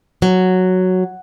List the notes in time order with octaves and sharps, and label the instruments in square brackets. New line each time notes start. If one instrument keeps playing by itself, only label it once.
[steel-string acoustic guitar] F#3